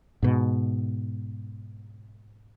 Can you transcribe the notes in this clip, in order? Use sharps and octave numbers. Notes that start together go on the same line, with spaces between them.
G#2 B2